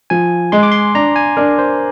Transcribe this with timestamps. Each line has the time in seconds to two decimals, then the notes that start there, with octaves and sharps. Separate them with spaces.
0.10 F3 G#5
0.52 G#3 C6
0.63 D6
0.71 C6
0.95 D4 A#5
1.16 G#5
1.37 D4 A#4
1.59 C5